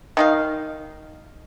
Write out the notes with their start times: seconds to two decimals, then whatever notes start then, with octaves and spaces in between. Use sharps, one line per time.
0.17 D#3 D#4 F5